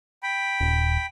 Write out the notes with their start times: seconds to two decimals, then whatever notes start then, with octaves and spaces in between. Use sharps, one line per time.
0.23 G5 B5
0.60 D#1